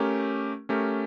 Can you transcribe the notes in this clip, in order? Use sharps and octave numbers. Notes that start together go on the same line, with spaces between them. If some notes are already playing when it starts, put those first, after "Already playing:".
Already playing: A3 C#4 G4 A#4
A3 C#4 G4 A#4